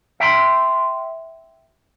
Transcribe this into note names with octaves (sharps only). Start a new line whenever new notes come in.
E5 G5 A#5 C6